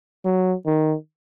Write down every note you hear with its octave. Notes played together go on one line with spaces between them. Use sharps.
F#3
D#3